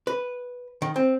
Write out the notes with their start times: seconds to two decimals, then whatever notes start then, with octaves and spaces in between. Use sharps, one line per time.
0.07 B4
0.82 D#3
0.96 C4